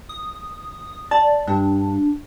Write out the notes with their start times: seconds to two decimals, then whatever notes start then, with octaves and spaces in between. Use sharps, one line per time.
0.09 D#6
1.11 D5 A5
1.47 G2 D4